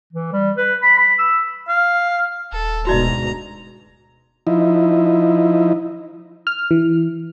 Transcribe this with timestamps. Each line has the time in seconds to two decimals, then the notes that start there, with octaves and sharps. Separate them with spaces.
0.13 E3
0.32 G3
0.57 B4
0.82 B5
0.97 B5
1.19 E6
1.68 F5
2.52 D#1 A4
2.87 D2 G#2 B2 F#4 D5 D#5 A#5
4.47 F3 D#4 E4
6.47 F6
6.71 E3